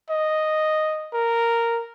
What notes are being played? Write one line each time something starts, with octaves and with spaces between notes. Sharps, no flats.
D#5
A#4